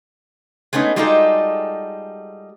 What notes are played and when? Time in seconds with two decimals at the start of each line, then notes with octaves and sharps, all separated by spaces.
0.73 G#3 A3 B3 C#4 D#4
0.96 G3 G#3 D#4 F4 F#4 A4